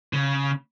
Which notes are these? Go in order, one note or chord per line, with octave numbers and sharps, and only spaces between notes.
C#3